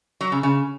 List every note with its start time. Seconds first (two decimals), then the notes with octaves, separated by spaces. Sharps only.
0.21 F#3
0.32 C#3
0.43 C#3